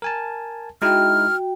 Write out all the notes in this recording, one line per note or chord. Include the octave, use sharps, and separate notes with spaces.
A#4 G#5 A5
G#3 D#4 E4 F#4 G5 F6